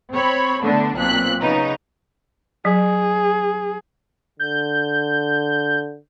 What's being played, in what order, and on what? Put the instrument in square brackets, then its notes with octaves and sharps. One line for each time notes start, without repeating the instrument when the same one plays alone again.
[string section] C4 C#5 B5
D3 A3 B3 D4
B1 A#2 C4 F#6 B6
C#3 B3 D#4
[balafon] F#3 [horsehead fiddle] G#4
[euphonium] D3 [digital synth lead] G6